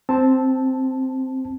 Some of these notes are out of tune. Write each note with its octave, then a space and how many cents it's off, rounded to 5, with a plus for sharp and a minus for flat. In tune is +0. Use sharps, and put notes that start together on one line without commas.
C4 +0 A5 +0